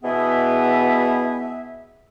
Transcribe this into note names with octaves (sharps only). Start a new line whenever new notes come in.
B2 E3 B3 G#4 E5